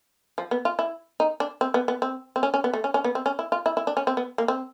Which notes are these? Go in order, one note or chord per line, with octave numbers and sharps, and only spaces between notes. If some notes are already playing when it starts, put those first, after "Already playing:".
F3
B3
F4
E4
D#4
D4
C4
B3
B3
C4
C4
C#4
C#4
B3
A3
C#4
C#4
B3
C4
C#4
E4
F4
E4
E4
D4
C#4
C4
B3
A#3
C4